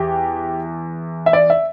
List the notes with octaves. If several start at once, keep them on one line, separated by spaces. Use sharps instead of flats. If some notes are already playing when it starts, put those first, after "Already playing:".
Already playing: E2 G4
E5
D5
E5